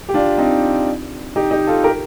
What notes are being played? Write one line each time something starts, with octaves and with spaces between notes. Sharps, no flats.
G4
D4 F4
C4 D#4
D#4 G4
D#4 G4
F4 A4
G4 A#4